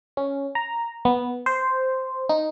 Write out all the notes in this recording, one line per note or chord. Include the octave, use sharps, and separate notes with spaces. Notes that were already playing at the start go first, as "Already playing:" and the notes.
C#4
A#5
B3
C5
D#4